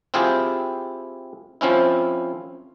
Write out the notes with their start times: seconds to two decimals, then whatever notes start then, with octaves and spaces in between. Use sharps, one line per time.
0.14 C4 E4 F4 G4 G#4
1.61 F3 C4 C#4 E4